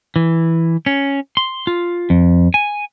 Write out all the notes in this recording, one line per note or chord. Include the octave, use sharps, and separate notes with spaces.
E3
C#4
C6
F4
F2
G#5